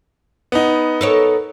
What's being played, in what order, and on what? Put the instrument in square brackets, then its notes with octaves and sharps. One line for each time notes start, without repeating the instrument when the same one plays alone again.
[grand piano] B3 D#4
[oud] A4 A#4 C#5